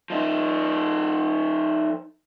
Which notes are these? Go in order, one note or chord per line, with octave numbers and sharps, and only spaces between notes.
F3 D#4